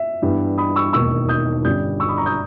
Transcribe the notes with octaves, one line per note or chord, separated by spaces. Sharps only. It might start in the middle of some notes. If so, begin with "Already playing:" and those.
Already playing: E5
G2 E3 G3 B3
B5 D#6
C#6 E6
E1 D#2 D#3 A#3 C#6 E6
D#6 G6
G1 G2 G3 C#4 D#6 G6
C#6 E6
B5 D#6
A#5 C#6
D#6 G6